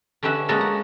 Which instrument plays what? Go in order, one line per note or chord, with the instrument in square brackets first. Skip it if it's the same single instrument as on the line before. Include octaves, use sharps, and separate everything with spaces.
[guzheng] D3 C#4 G4 B4 E5 F#5
G#3 A#3 C#4 F#4 A4 A#4
F#5